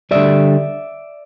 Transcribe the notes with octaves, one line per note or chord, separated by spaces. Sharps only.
D3 G3 D5 E5